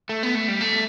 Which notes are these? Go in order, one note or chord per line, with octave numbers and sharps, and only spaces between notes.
A3
B3
A3
G3
A3